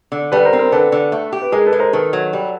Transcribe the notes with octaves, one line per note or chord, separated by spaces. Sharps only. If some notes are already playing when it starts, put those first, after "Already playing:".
D3
G3 A4 B4
A#4 C5
C4
A#4 C5
D3 A4 B4
D3
A3
G4
B4
G#3 G#4 A#4
A4 B4
G#3
A#4 C5
D#3 A4 B4
F#3
G3